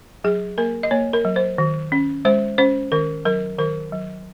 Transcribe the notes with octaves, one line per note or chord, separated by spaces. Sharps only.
F#3 G#4
A#3 A#4
D#5
A#3 C#5
A#4
F#3
C5
D#3
C#4
G#3 C5
C#4 C5
D#3 A#4
F#3 A#4
D#3 A#4
F#3